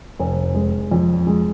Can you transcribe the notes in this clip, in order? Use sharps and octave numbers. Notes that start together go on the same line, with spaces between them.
F1
G#3
F2
G#3